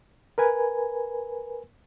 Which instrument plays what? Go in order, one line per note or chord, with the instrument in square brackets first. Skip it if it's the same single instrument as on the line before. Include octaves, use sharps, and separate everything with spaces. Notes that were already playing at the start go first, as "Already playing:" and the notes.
[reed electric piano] A#4 B4 G#5